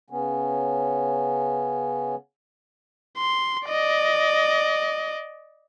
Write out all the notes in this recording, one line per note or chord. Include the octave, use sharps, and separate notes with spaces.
C#3 B3 C#4
C6
D5 D#5